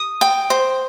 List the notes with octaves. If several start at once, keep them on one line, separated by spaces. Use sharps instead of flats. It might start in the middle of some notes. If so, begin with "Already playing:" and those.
Already playing: D#6
G5
C5